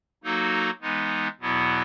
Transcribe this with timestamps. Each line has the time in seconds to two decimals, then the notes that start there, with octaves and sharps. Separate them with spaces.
0.24 F#3 A#3 D#4 F#4 A4
0.81 E3 G#3 B3 D#4
1.40 E2 B2 F#3 B3 E4